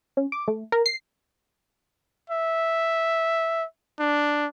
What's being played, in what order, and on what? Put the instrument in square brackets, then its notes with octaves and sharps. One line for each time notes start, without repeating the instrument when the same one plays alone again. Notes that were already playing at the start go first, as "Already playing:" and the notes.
[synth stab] C#4
D6
A3
A#4
C7
[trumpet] E5
D4